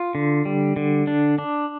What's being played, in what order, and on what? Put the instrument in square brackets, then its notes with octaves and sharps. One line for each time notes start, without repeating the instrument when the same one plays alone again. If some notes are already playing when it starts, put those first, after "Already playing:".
Already playing: [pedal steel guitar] F4
D3
G3
D3
D4
D4